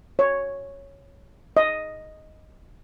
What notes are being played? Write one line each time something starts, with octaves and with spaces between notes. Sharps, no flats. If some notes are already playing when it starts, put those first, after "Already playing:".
C#5
D#5